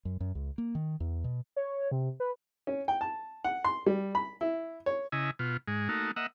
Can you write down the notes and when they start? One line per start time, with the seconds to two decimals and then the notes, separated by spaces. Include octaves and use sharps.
0.05 F#2
0.20 F#2
0.35 C#2
0.58 A#3
0.75 D#3
1.00 E2
1.24 B2
1.56 C#5
1.91 C3
2.20 B4
2.67 C#4
2.88 G5
3.01 A5
3.44 F#5
3.64 C6
3.86 G3
4.15 B5
4.41 E4
4.86 C#5
5.12 C#3 E4 D#5 G#5
5.39 B2 F4
5.68 G#2 G#3
5.89 A3 A#3 D#4 F#4
6.16 A#3 D#5 E5 F#5